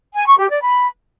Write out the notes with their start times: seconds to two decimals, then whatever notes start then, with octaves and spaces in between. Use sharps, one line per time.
0.14 G#5
0.26 C#6
0.38 G4
0.50 D5
0.62 B5